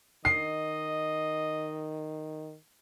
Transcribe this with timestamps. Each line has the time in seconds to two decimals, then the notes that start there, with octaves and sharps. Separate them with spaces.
0.25 D#3 D#5 C7